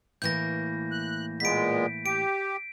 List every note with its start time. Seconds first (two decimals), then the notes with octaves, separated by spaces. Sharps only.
0.22 A2 E3 A#3 G6 A#6
0.91 F#6
1.40 A#2 G#3 B3 B6 D7
2.06 G4 D7